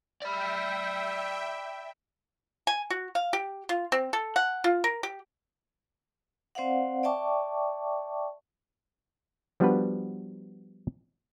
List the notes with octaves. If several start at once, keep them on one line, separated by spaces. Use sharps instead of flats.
D5 E5 G5 B5
G#5
F#4
F5
G4
F4
C4
A4
F#5
F4
A#4
G4
C4 C5 D5 F5 F#5
D5 E5 G5 A5 C#6 D6
F3 G3 B3 D4 F#4 B4